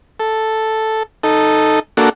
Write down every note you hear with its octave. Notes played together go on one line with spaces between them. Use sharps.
A4
D#4 A4
A#3 D4 F#4 A4